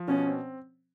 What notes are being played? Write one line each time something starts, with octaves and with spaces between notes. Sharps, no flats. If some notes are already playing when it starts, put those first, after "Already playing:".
Already playing: F3
B2 C#4
C4